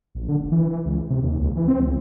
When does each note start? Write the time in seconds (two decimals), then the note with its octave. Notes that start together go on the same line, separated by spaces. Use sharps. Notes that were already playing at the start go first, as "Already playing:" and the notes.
0.15 A#1
0.29 D3
0.40 F1
0.52 E3
0.70 E3
0.85 C#2
1.10 C3
1.23 D#2
1.39 C#2
1.56 E3
1.68 C4
1.80 C#2